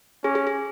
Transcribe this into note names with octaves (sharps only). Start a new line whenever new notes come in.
C#4 G#4
G#4
G#4